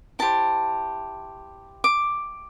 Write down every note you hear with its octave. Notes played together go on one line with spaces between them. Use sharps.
E4 G4 C5 A5
D6